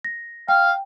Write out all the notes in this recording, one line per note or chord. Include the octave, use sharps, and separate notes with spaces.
A#6
F5 G5